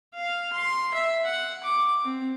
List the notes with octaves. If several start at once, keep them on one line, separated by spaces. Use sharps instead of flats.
F5
C6
E5
F#5
D6
C4